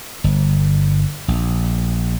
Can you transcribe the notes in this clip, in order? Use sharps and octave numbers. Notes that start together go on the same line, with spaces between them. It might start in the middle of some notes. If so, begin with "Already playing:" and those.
G1
A#1